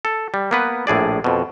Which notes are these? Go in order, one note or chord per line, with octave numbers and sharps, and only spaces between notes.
A4
G3
A#3 B3 B4
A#1 A2 G#4 D5
F2 B2